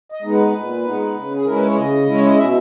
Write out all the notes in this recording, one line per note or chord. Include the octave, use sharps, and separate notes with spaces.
D#5
G#3 B3 D#4
B4
A#2
G#3 B3 D#4
C#3
G#4
G#3 C#4 E4 A#4
B4
C#5
C#3 D#5
G#3 C#4 E4
C#5
D#5
B2 E5